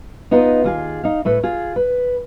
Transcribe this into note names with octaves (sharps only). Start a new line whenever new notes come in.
B3 D#4 F4 B4
D#2 F4 G#4
D#4 F5
A2 A3 B4
F4 G#4
B4